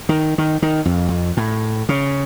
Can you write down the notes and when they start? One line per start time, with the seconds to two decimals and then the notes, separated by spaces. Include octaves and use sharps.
0.09 D#3
0.38 D#3
0.62 D#3
0.85 F2
1.09 F2
1.37 A2
1.89 C#3